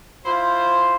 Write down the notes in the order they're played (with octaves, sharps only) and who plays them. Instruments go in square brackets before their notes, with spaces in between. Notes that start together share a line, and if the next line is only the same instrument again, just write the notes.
[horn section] E4 F4 C5